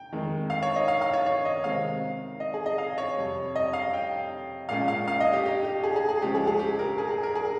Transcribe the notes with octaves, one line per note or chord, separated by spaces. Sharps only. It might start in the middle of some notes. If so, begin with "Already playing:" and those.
Already playing: G5
F2 D#3 G#3
F5
C#5
D#5
F5
F5
C#5
C#5
D#5
C3 D#3 G#3 C4 F5
D#5
G#4
D#5
F5
C#5
F2 C3 G3
D#5
F5
G5
A#2 G#3 C#4 F5
F5
F5
D#5
G4
G4
G4
G#4
G#4
G#4
C#2 C#3 F3 G#3 C#4 G4
G#4
G#4
G4
A#4
G#4
G#4
A#4
G#4